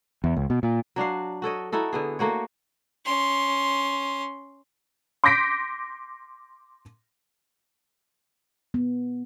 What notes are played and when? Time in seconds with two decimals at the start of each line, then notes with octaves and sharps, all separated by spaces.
0.24 E2
0.37 C#2
0.50 B2
0.63 A#2
0.96 F#3 D4 F#4 F5
1.42 F#4 A4 C#5 D#5
1.72 D#4 E4 F#4 A4
1.93 D3 B3 G#4
2.19 A3 A#3 F#4 C#5
3.06 C#4 C6
5.24 C6 D6 G6 A#6 B6 D7
8.74 B3